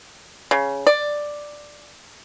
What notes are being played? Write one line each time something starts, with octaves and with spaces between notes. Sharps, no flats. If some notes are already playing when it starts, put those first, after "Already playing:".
C#3
D5